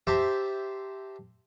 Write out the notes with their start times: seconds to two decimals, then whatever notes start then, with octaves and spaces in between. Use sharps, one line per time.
0.07 G4 C5 E5 A5 A#5 C6